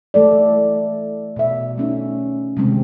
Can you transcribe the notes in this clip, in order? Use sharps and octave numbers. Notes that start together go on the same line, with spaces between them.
E3 A3 A4 D5
B2 E5
A3 C#4 D#4
C3 D#3 G3 G#3 C4